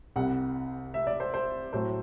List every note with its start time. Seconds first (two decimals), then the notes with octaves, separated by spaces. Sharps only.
0.16 C2 C3 G3 F#5
0.94 E5
1.07 D5
1.20 C5
1.34 C5
1.73 A2 F#3 A3 C5